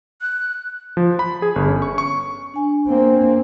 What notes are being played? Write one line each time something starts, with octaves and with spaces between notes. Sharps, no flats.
F#6
F3
B5
G#4
G1
C#4
C#6
C#6
D4 G#5
A#3 C4